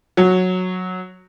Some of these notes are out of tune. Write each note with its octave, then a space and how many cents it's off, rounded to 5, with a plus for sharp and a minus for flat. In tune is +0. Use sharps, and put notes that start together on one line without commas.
F#3 -10